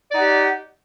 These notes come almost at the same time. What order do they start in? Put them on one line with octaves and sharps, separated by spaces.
D5 D#4 F#5 G4